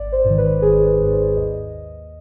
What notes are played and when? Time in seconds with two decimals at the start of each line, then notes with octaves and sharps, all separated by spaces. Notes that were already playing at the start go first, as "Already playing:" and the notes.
Already playing: G#1 D5
0.12 C5
0.25 G#2 D#3
0.38 B4
0.62 G#1 G#4
0.87 B4
1.00 G#2 D#3
1.12 C5
1.37 D#2 D#5